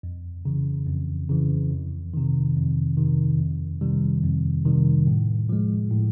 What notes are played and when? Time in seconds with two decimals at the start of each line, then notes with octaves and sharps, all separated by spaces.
0.03 F2
0.45 C#3 E3
0.87 F2
1.29 C#3 E3
1.71 F2
2.14 C3 D#3
2.56 F2
2.97 C3 D#3
3.39 F2
3.81 C3 D#3 G3
4.24 F2
4.65 C3 D#3 G3
5.07 A2
5.49 F3 G#3
5.91 A2